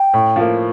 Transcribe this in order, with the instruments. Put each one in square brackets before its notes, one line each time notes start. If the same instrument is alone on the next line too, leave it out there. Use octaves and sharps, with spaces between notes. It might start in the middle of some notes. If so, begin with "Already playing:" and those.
Already playing: [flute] G5
[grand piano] A2
F3 A#3